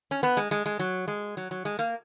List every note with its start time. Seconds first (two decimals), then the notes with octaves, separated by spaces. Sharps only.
0.11 C#4
0.23 B3
0.37 G#3
0.51 G#3
0.66 G#3
0.79 F#3
1.08 G#3
1.37 F#3
1.51 F#3
1.65 G#3
1.79 A#3